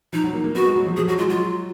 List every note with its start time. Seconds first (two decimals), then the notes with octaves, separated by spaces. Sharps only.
0.13 F3 D#4
0.24 F#3
0.33 A#3
0.44 A#3
0.55 B3 F#4
0.66 G#3
0.76 F#3
0.86 F3
0.97 F3 G#4
1.08 F#3 F#4
1.18 G#3 F4
1.30 F#3 F4